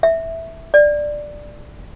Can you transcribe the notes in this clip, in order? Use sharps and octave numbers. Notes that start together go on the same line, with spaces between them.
E5
D5